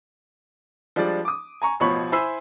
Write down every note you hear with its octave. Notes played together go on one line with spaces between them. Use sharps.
F3 G3 G#3 D4 D5
D6 D#6
G#5 A#5 C#6
A1 B2 F3 C#5 B5 C#6
E4 C5 G#5 B5 E6 C7